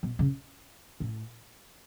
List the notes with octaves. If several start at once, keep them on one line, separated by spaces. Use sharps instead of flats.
B2
C#3
A2